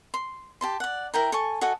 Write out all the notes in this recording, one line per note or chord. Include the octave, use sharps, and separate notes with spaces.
C6
G4 A5 C6
D5 F#5
E4 A#4 G5 A#5
A4 G#5 C#6
F#4 A4 D#5 G#5